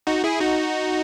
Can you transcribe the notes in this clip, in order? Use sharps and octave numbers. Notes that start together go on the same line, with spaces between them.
D#4 F#4
E4 G#4
D#4 F#4